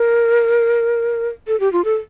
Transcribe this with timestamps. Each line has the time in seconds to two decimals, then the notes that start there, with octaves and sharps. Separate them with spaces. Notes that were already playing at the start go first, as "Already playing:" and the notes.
Already playing: A#4
1.48 A4
1.60 G4
1.72 F4
1.85 A4